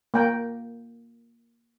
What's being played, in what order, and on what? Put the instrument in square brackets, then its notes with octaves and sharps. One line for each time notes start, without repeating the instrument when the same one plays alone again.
[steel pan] A#3 G5